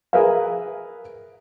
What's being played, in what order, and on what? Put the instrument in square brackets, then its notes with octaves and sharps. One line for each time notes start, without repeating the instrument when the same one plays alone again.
[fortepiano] G#4 A#4 B4 E5 F5